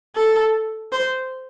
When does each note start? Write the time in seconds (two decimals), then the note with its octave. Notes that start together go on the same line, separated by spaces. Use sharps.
0.16 A4
0.92 C5